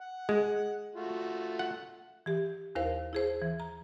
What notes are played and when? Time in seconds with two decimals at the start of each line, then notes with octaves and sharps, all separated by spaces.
0.01 F#5
0.29 G#3
0.95 A3 F4 F#4
1.59 F#5
2.26 E3 G4
2.75 D#2 E4 A#4 C5 F5
3.13 E4 G#4 C5
3.42 E3
3.60 A#5